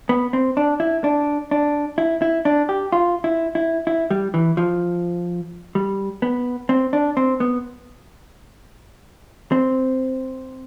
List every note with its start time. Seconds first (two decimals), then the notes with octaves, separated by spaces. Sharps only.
0.09 B3
0.33 C4
0.57 D4
0.80 E4
1.04 D4
1.51 D4
1.98 E4
2.22 E4
2.45 D4
2.69 G4
2.92 F4
3.24 E4
3.55 E4
3.87 E4
4.10 G3
4.34 E3
4.57 F3
5.75 G3
6.22 B3
6.69 C4
6.93 D4
7.17 C4
7.40 B3
9.52 C4